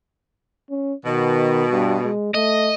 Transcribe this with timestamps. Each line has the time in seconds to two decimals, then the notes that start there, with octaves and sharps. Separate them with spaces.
0.70 C#4
1.06 B2 D#3
1.71 G2
2.04 G#3
2.34 A3 D#5